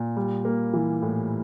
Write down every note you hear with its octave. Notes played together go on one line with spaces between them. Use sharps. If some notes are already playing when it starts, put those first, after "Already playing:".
Already playing: A#2
G3
A#3
E3
A2